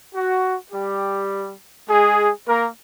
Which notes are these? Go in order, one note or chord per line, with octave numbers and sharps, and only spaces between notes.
F#4
G3 G4
G#3 G#4
A#3 A#4